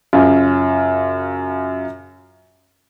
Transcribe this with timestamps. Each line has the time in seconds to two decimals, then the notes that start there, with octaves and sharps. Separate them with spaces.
0.13 F#2 C#3 F4